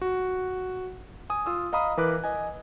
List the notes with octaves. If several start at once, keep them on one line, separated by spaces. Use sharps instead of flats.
F#4
G#5 D#6
F4 D#6 E6
D#5 F5 A#5 B5 D#6
E3 A#4 B4 D6 F#6
D#5 G#5